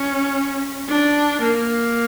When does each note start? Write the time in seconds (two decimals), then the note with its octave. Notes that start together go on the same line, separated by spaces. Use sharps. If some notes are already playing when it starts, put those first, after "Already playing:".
Already playing: C#4
0.88 D4
1.41 A#3